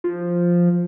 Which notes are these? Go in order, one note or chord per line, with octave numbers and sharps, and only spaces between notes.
F3